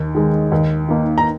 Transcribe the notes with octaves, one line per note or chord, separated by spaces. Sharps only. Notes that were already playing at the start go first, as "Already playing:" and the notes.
Already playing: D#2
D#3 G#3
D#2
D#3 A#3
A#5